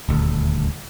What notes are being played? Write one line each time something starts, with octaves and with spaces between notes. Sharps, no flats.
D#1 D2